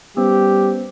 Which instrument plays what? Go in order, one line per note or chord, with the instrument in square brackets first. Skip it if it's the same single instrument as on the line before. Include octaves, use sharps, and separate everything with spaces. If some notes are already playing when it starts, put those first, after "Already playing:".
[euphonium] G3 [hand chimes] B3 C#4 C5 [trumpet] G4